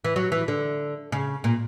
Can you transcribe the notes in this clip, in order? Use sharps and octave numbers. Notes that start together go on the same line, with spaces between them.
E3
F#3
E3
D3
C#3
A#2